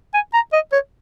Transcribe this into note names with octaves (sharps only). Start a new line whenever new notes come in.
G#5
A#5
D#5
C#5